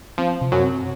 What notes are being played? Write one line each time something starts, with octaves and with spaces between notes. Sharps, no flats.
F3 C4
C3
F#2 F#3
C4